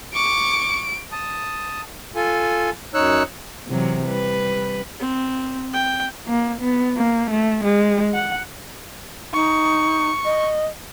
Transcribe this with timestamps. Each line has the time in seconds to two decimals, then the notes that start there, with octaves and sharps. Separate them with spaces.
0.14 C#6 D6 D7
1.12 A5 D#6
2.16 F4 A4 G#5
2.94 F#2 D#4 C#5 E6 F#6
3.68 C3 E3 F#3
4.07 G3 B4
4.99 C4
5.73 G5
6.28 A#3
6.61 B3
6.97 A#3
7.31 A3
7.64 G#3
8.14 F#5
9.33 D#4 C#6
10.25 D#5